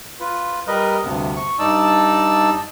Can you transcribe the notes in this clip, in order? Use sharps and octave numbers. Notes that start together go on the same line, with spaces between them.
F4 B4
G3 A#4 B4 D#5
D2 G2 C3 B3
C#6
G2 D#4 D5 A5 E6